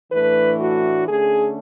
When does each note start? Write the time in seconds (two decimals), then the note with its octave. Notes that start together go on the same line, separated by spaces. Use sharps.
0.12 A2 E3 A3 D4 B4
0.60 F#4
1.07 D3 A3 C#4 G#4